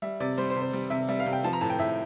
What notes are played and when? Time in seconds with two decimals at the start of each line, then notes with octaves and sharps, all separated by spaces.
0.02 G3 E5
0.20 C3 D5
0.38 G3 C5
0.50 C5
0.56 C3
0.62 C5
0.73 G3
0.90 C3 E5
1.08 G3 E5
1.20 F5
1.26 C3
1.33 G5
1.44 F3 A5
1.53 A#5
1.61 A2 A5
1.70 G5
1.78 A2 E5